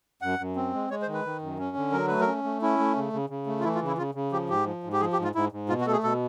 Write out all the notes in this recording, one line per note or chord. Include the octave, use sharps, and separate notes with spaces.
F#2 F#5
F#2
C4
G#3
G#3 C#5
C5
D#3
B4
D#3
F#2
C#4
D3
F#3 A#4
A3 B4
A#4
C#4
A3
C#4 E4
A3
C#3
C#3
C#3
A3
F4
E3 E4
F4
C#3
E4
C#3 F4
C#3
F3 G4
G#2 G4
F3
G#2
G4
F3 G#4
G4
G#2
F4
G#2 E4
G#2
B2 F4
F#4
A3 A4
G#4
B2 A4